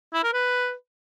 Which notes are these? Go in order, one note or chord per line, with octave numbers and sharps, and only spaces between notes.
E4
A#4
B4